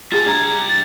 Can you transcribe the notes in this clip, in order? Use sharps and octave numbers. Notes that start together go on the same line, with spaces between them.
G3 F4 G#4 E5 A5 A6
D4 A#5 G#6
A6